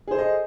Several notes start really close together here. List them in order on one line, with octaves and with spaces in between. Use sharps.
G#4 C5 A4 D#5